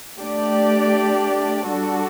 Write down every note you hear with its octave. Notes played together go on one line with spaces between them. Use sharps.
A3 D4 G4 D5
G3 D4 F#4 A4